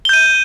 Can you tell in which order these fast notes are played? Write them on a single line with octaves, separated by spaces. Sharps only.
G7 G6 D#7